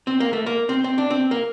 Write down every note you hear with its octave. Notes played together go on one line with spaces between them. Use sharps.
C4
A#3
A3
A#3
C4
C4
D4
C4
A#3